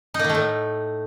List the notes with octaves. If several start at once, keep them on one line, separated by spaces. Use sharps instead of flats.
D#4
A#3
D#3
A3
A2